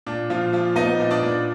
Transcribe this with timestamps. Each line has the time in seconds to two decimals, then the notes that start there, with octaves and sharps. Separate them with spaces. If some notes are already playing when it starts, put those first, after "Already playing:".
0.06 A#2 D4
0.30 A#2 F3 F4
0.53 F3 F4
0.76 B3 D#4 D#5
1.00 A#2
1.10 D4 D5
1.23 A#2